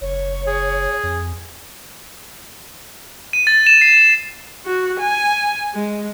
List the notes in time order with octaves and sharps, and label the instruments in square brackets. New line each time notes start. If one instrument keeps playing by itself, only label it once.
[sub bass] F#1 [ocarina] C#5
[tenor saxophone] G#4
[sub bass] F2
[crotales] D#7
A6
E7
C7
[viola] F#4
G#5
G#3